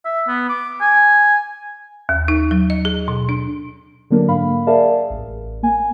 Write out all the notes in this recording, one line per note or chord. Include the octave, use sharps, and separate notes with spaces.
E5
B3
D6
G#5
D#2
D#4
F#3
D#5
G#4
B2
D4
D3 F#3 A#3 D4 A#4
G#2 F5 B5
G#4 A#4 D5 E5 F5 A5
A1
A#3 G#5